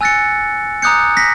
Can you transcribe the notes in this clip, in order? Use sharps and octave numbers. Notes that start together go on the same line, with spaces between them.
G#5 E6 F#6 A6 A#6 C#7
A#5 D6 D#6 F#6 G6 C#7
A#6 B6